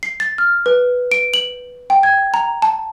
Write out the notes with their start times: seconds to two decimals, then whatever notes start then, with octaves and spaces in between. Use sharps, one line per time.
0.03 C7
0.20 A6
0.38 F6
0.66 B4
1.12 D7
1.34 F#7
1.90 G5
2.03 G#6
2.34 A#5
2.62 A5